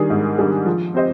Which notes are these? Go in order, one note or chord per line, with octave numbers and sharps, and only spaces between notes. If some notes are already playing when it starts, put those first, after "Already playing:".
Already playing: D#3 G3 D4 G#4
G#2
D#3 G3 D4 G#4
F3
C4 G4 C5 D#5